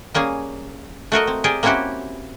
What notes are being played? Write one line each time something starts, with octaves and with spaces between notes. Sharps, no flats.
G3 A#3 C#4 G#4
A3 F#4 A#4 D#5
C4
G4 G#4 A#4 D5
A#3 C4 C#4 E4 F#4 G4